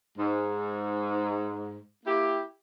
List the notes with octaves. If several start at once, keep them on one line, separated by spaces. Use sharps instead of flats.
G#2
A#3 E4 G4